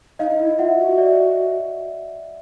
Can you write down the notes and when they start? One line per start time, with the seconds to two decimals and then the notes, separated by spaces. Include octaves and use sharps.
0.19 D#4 D#5 F5
0.30 D#4
0.40 E4
0.59 F4 E5 F#5
0.78 F#4
0.98 D5 E5